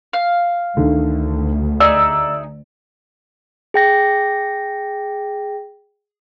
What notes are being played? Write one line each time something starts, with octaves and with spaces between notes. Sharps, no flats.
F5
D2 D3 D#3
D#4 G#4 D5 E5 E6
G#4 G5 A#6